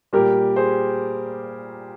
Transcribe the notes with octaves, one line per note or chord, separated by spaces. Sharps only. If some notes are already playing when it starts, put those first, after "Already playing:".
A#2 G3 G4 A#4
G#4 C5